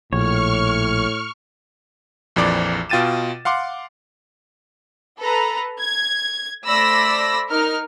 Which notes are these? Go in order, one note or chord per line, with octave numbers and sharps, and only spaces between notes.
A#1 A2 C#5 C#6 F6
A#1 F2 E3 D5 D6
B2 F4 G5 A6 D#7 E7
F5 F#5 C6 D6
A4 B4 A#5
G#6
A3 C5 D5 B5 E6 A#6
D#4 A#4 F6